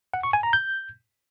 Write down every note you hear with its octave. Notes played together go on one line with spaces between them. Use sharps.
F#5
C#6
G#5
A#5
G6